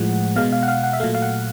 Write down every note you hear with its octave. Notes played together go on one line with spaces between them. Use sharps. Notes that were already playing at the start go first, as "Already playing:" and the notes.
Already playing: A2 F3 G#3 F#5
B2 G#3 F5
F5
F#5
F5
F#5
E5
A#2 F#3 A3 F5
F5
F#5